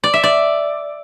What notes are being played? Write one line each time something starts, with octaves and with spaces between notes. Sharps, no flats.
D5
E5
D5